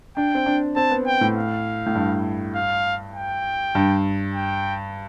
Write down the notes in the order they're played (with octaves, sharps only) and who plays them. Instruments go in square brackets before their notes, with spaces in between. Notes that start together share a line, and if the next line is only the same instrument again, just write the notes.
[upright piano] D4 [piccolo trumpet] G5
[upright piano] C4
D4
[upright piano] C4 [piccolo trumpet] A5
[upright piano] B3
[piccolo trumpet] G5
[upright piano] A2
[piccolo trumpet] F5
[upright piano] A2
G2
[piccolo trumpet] F5
G5
[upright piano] G2
[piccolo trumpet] G5